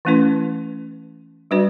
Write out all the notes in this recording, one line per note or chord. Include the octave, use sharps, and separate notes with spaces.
E3 A3 C#4 E4 B4
G3 D4 F#4 B4 D5